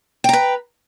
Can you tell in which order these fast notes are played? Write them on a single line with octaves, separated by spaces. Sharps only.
G5 A#5 B4